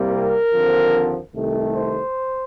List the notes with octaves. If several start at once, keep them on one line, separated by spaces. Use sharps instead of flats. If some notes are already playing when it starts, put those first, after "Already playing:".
Already playing: C2 C3 G3 A#3
A#4
D#2 D3 F3 C4
C2 C3 D#3 A3
C5